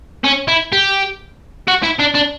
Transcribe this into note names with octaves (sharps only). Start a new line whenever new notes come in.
C#4
E4
G4
F#4
E4
D4
D4